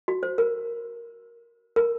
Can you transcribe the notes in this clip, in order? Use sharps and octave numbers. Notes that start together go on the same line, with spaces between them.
F#4
C5
A#4
A#4